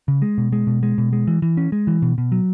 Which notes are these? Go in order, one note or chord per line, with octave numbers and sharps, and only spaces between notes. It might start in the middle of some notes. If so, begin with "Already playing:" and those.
C#3
G#3
B2
G#3
B2
G#3
B2
G#3
E3
E3
C#4
G#3
E3
B2
B2
F#3